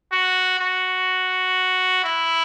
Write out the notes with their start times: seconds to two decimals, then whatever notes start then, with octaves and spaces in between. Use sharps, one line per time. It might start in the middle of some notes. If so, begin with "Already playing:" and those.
0.12 F#4
0.60 F#4
2.04 E4